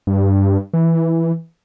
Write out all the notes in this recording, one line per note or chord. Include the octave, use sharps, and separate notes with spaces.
G2
E3